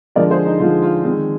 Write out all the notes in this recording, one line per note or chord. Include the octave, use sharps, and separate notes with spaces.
D3 F3 G#3 A#4 D5
G#4 C5
D#4
D3 F3 G#3 F4
F4
D#3 G#3 C4